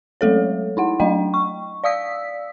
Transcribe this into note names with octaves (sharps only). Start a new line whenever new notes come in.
F#3 G#3 A3 A4 C#5
D#4 E4 F#5
F#3 A3 D4 D#5 G5
C#6
D5 F5 D#6 E6 B6